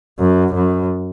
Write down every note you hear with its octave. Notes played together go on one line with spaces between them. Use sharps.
F#2
F#2